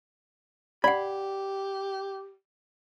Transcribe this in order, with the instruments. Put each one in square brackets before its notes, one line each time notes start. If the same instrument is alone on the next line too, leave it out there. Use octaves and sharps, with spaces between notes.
[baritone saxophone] G4 [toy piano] D5 F#5 [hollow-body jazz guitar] B5